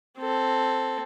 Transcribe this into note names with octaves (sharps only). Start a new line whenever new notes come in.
C4 A4